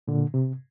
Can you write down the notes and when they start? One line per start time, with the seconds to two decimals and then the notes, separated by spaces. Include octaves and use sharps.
0.08 A#2 D3
0.34 C3